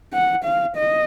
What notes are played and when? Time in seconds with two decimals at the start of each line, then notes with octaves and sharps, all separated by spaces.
0.14 F#5
0.44 F5
0.76 D#5